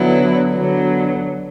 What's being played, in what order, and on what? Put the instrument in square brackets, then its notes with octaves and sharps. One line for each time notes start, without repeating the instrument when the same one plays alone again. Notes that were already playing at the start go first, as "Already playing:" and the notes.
Already playing: [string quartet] D3 F#3 B3 E4
D3 F#3 B3